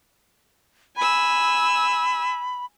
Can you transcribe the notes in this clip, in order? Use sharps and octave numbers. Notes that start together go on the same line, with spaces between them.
G#5 B5 E6